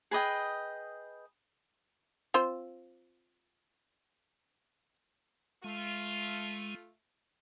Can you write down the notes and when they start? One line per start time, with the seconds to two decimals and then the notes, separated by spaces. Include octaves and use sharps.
0.11 G#4 B4 D#5 G5
2.34 C4 F4 C5
5.64 G#3 A3 F4